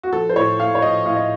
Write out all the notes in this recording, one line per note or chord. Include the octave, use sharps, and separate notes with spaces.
F#4
F3 A4
C5
A2 C#5
A2 F5
C#5
F3 D#5
A2 F5
D#5